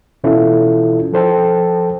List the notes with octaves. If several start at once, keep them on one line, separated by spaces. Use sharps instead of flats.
B2 E3 C#4 E4 F4 A4
F3 A4 C5 G5 A5